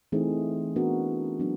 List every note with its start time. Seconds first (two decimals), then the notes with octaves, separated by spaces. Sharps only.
0.12 E3 A3 C4 D#4 G#4
0.76 B3 D4 F#4 A#4
1.39 F#3 B3 D4